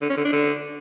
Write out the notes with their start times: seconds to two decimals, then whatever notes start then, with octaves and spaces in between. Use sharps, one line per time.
0.02 D3
0.09 C#4
0.17 D3
0.25 D4
0.33 D3